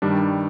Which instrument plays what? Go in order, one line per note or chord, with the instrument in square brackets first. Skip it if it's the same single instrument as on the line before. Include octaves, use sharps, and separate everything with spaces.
[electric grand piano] G2 D#3 G3 D4